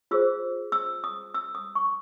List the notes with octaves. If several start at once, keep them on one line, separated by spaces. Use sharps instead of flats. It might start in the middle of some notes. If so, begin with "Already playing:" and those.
F4 G#4 C5 E6
E6
D#6
E6
D#6
C#6